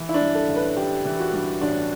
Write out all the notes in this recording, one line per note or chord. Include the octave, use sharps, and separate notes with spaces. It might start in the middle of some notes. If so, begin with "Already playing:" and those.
Already playing: E3
E4
D4
G2
A4
A1
B4
A1 G4
E3
F#4
G2
A1 D4